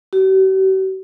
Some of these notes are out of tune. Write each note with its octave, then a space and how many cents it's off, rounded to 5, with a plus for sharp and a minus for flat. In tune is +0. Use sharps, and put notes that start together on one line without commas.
G4 -45